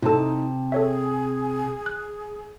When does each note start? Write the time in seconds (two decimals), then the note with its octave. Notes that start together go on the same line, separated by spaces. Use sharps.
0.02 C3 D#4 E4 A4 A5
0.72 G#4 A4 C#5 E5
1.86 F#6